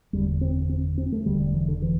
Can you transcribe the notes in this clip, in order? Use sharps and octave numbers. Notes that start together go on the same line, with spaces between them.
F#1 E2 D3 G3
C4
C4
C4
A3
E1 D2 D3 G3
G3
E3
D3
E3